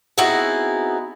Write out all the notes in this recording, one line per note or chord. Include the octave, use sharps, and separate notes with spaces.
B3 C4 D#4 E4 F#4 G#4